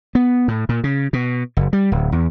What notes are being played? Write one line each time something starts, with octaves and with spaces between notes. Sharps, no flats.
B3
A2
A#2
C#3
B2
F#1
G3
D1
E2